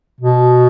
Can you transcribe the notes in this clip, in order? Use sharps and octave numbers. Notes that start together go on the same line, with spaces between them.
B2